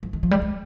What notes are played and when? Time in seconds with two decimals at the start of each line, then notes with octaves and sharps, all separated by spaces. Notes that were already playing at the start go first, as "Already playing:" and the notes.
0.03 F3
0.13 D#3
0.23 F3
0.31 G3
0.42 G#3